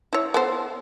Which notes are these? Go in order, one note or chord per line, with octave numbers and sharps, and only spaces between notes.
E4 C#5
B3 A4 C5